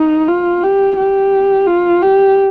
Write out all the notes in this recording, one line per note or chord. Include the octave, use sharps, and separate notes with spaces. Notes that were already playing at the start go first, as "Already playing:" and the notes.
Already playing: D#4
F4
G4
G4
F4
G4